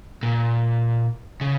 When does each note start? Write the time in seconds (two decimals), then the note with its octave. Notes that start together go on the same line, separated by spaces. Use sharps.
0.23 A#2
1.41 C#3